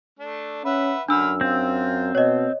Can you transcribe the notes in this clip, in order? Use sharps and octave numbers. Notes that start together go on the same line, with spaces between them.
A3 D4
C#4 B4 E5 F#5
F#2 D3 D4 B5 E6 F6
C4 F4
B2 C#5 D#5